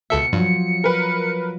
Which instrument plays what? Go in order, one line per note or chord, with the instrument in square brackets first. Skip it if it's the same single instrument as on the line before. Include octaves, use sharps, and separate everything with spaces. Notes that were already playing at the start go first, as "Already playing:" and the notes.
[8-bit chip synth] C#2 A4 E5 [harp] B2 [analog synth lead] C#7
[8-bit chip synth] G2 [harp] F3 F#3
[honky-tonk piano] A#4 B4